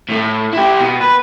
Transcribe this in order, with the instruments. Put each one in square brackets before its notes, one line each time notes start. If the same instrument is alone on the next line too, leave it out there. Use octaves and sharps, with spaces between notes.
[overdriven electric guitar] A2 A3
E4 G4
B2
B4